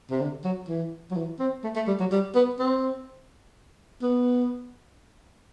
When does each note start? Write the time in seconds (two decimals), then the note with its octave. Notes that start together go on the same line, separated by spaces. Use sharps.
0.11 C3
0.20 D3
0.44 F#3
0.68 E3
1.11 F#3
1.17 E3
1.40 C4
1.64 A3
1.76 A3
1.88 G3
2.00 F#3
2.12 G3
2.35 B3
2.59 C4
4.02 B3